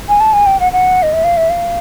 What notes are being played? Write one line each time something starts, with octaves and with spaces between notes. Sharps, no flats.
G#5
A5
G#5
G5
F#5
F#5
D#5
E5
F5
E5
F5